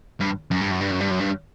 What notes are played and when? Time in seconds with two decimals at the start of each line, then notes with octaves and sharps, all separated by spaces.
0.20 G2
0.51 F#2
0.61 G2
0.71 F#2
0.81 G2
0.91 F#2
1.01 G2
1.11 F#2
1.20 G2